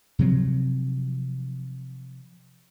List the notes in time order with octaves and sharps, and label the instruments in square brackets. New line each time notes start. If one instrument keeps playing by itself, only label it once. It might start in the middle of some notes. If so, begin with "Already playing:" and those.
[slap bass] C3 F3 F#3 C4